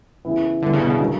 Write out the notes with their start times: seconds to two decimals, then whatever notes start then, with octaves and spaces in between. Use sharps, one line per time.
0.25 C#3 E3 B3 E4
0.62 G2 D3 E3 B3
0.73 C#3
0.81 B2
0.90 C#3
0.99 D3 F#3 A#3